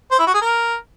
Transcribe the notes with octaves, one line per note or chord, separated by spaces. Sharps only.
C5
E4
F#4
G#4
A#4